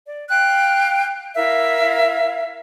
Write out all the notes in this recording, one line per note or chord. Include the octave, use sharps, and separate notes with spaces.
D5
F5 G5 F#6
E4 A#4 E5 F5